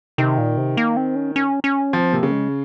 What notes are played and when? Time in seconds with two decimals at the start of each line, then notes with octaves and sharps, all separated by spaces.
0.18 C3 D#3
0.38 A#2
0.58 C3
0.77 A#3
0.97 C4
1.16 C#4
1.36 C#4
1.64 C#4
1.93 F3 C4
2.13 C3 A#3
2.23 C#3
2.32 G#3